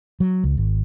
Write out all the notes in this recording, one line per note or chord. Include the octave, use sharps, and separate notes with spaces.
F#3
C#2
G#1